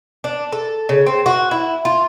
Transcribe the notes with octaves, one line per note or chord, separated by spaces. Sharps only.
D4
A4
C#3
C4
F#4
E4
F4